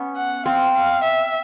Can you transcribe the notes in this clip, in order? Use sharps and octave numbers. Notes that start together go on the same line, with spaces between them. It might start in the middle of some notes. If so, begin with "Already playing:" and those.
Already playing: B3 C#4
F#5
C4 F5
F5
E5